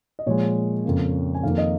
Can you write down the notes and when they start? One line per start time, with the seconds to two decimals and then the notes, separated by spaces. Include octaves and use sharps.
0.19 D#5
0.26 A#2 F3 G#3 C#5
0.85 F2 C#3 A#3
1.34 G#5
1.43 F2 D#3 A#3 F5
1.58 D#5